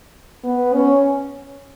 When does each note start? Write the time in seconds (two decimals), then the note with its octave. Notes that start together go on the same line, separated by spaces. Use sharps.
0.44 B3
0.73 C#4